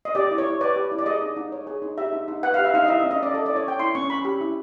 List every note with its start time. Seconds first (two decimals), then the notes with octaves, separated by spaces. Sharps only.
0.05 D#5
0.15 G4 D5
0.31 E4
0.38 C#5
0.46 E4
0.61 B4 D5
0.76 G4
0.92 E4
0.99 D5
1.06 G#4 D#5
1.22 D#4
1.37 D#4
1.52 C#5
1.67 G#4
1.82 D#4
1.98 G4 E5
2.12 D#4
2.28 D#4
2.43 B4 F#5
2.54 G4 F5
2.65 E5
2.74 D#4 F5
2.84 D#5
2.88 E4 E5
3.00 D#5
3.04 C#4
3.11 D#5
3.19 C#4 D5
3.34 A4 D#5
3.46 D5
3.49 E4
3.56 C#5
3.64 C#4 G5
3.79 E4 C6
3.95 C#4 C#6
4.10 C#4 B5
4.25 G4
4.41 E4